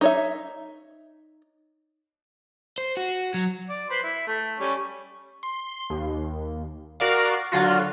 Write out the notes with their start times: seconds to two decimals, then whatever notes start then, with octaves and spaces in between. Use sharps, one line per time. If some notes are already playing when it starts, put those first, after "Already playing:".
0.01 D#4 C#5 E5
2.78 C5
2.97 F#4
3.34 F#3
3.69 D5
3.90 B4 C5 C6
4.03 E4
4.27 A3
4.59 G3 C#4 C#5
5.43 C6
5.90 D#2
7.00 F#4 A#4 D5 F5
7.52 D3 F#3 F4 F#4